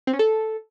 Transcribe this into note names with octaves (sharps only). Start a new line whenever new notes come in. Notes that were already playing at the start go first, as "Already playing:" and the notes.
C4
C#4
A4